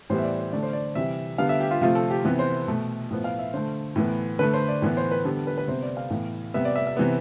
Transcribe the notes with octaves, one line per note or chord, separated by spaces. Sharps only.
A2 E3 G3 B3 C5
E5
D5
C5
D3 A3 D5
C5
D5
C3 E3 G3 E5
D3 G3 B3 F5
E5
G4
F4
C3 F3 A3 F4
A4
G4
C3 E3 B3 B4
C5
B2 A3
A2 F3 B3
F5
E5
D3 A3 C5
A2 E3 B3
D3 A3 B4
C5
D5
A2 E3 B3
C5
B4
D3 G3 B3 A4
B4
B4
C3 G3 B3 C5
D5
F5
A2 E3 B3
C3 G3 B3 E5
D5
E5
E5
C3 E3 B3